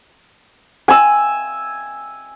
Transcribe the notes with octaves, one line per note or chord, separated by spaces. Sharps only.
G#5 E6